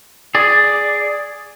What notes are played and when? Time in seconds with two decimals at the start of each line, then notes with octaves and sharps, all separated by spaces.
0.35 G#4 D5